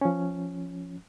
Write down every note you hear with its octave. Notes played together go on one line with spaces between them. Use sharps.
F3 C#4